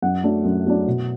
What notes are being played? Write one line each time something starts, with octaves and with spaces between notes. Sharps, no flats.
F#2 F#5
F#3 A3 D4
F#2
F#3 A3 D4
B2